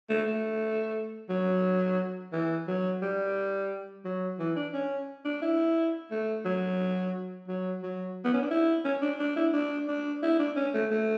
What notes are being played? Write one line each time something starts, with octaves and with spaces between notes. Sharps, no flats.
A3
A3
F#3
E3
F#3
G3
F#3
E3
D4
C#4
D4
E4
A3
F#3
F#3
F#3
B3
C#4
D4
E4
C#4
D4
D4
E4
D4
D4
E4
D4
C#4
A3
A3